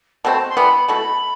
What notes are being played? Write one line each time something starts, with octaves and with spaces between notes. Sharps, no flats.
B2 A3 C4 A5
C6
E3 G3 B3 B5
B2 A3 E4 A4 B5